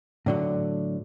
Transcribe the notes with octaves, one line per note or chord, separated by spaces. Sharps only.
A2 D3 F#3